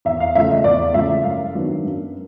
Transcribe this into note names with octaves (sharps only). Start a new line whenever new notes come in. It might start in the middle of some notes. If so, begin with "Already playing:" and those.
E2 E5
F5
C#3 F3 A3 E5
D#5
E2 D5
C#3 F3 A3 E5
F#2 F5
D#3 F#3 B3 D4
F#2